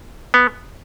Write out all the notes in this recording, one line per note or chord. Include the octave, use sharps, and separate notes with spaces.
B3